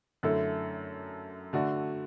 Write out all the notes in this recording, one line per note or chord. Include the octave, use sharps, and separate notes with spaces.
F#2 D3 A3 E4 A4
D3 A3 F#4 D5